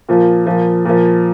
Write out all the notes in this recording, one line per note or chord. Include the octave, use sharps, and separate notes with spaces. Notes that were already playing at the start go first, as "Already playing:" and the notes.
A#2 F3
A#2 F3
A#2 F3